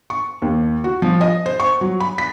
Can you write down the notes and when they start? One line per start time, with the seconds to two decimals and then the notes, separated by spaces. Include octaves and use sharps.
0.10 C#6
0.42 D#2
0.84 F#4
1.02 F3
1.21 D#5
1.46 C5
1.60 C#6
1.81 F#3
2.00 B5
2.18 B6